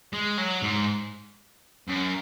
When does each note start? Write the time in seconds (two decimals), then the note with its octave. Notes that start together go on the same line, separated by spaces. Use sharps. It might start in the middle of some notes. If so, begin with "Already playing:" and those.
0.13 G#3
0.38 F#3
0.63 G#2
1.88 F#2